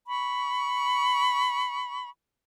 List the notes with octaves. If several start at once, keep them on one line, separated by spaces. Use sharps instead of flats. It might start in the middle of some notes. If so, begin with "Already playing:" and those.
B5 C#6